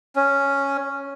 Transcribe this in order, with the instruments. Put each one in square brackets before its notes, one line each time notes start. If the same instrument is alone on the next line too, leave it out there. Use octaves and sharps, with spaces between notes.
[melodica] C#4